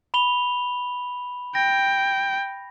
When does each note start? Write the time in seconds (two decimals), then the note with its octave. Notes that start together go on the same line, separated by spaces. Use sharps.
0.14 B5 F7 G7
1.55 G5 A#6